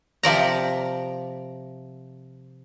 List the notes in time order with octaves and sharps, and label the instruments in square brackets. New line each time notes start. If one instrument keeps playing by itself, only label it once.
[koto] C3 F3 D5 A#5